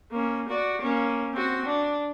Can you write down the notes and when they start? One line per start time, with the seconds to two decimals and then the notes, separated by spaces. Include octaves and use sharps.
0.12 A#3 C#4
0.49 F#4 D5
0.82 A#3 C#4
1.33 C4 F#4
1.65 D4